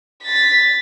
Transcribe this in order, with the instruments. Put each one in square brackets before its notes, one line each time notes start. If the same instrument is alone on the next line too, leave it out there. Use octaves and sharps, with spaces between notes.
[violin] A6 B6